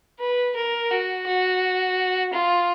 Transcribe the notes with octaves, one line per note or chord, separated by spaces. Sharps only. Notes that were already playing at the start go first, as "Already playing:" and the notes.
B4
A#4
F#4
F#4
F4